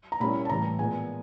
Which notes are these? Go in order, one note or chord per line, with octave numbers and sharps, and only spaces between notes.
A#5
A#2 G3 A#3 C#4 E4 B5
A5
A2 E3 G3 A#5
A#2 F3 G#3 B3 G#5